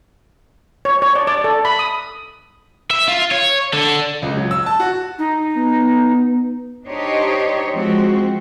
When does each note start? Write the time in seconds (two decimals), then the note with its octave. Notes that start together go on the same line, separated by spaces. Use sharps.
0.85 C#5
1.02 C#5
1.15 D5
1.27 D5
1.44 A4
1.65 B5
1.79 D#6
2.91 E5
3.08 F4
3.32 C#5
3.74 D3
4.22 C#2
4.37 F#3
4.51 E6
4.66 A5
4.80 F#4
5.18 D#4
5.57 B3
6.87 D4 D#4 G4 C5 C#5 D#5
7.71 F3 G#3 C4 F#4